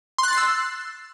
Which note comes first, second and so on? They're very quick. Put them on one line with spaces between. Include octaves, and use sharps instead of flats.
C6 F#6 A6 C7 E6